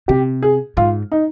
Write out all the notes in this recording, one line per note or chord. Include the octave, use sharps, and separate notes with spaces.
C3 G4
G#4
G#2 F4
D#4